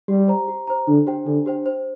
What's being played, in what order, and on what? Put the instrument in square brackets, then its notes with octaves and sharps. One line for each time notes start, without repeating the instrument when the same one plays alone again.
[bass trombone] G3 [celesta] G4
[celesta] C5 A#5
G4
C5 A#5
[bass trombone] D3 [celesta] D4
[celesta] G4 C5 G5
[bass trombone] D3 [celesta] D4
[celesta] G4 C5 G5
C5